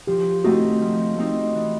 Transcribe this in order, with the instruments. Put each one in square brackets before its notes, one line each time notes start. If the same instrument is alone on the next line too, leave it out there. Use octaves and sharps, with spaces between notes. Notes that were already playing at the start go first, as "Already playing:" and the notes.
[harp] F3 [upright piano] G4
[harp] A3 C4 D#4 [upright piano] F#4
[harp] F3
A3 C4 D#4
E3